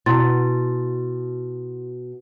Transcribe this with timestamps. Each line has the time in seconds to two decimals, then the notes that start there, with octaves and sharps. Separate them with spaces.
0.06 B2 E4 C6 A6